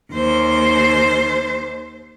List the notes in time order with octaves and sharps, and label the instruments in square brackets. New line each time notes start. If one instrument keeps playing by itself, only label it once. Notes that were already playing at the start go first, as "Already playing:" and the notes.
[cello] D#2 C5